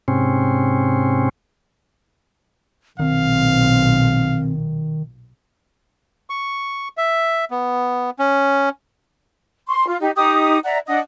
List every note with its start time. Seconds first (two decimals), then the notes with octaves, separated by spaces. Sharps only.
0.08 G#2 C3 C4 C#4
3.00 B1 A#2 D#3 C4 F5
6.30 C#6
6.97 E5
7.51 B3
8.19 C#4
9.69 C6 C#6
9.86 F4
10.01 D#4 G4
10.16 D#4 G4 D6 D#6
10.64 D5 E5 F#5 A#5
10.88 D4 D#5 F#5 D#6